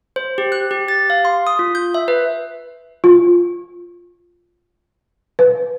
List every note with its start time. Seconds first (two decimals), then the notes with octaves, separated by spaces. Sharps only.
0.16 C5
0.38 G4
0.52 F#6
0.71 G4
0.88 A6
1.10 F5
1.25 C6
1.47 D#6
1.59 F4
1.75 G6
1.94 E5
2.08 B4
3.04 F4
5.39 B4